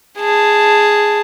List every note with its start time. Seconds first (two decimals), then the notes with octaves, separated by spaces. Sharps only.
0.19 G#4 A5